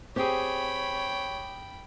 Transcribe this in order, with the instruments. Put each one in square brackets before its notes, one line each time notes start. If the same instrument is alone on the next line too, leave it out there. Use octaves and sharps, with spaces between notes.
[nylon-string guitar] C4 [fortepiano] G4 G#4 [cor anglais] C#5 [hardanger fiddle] G5 B5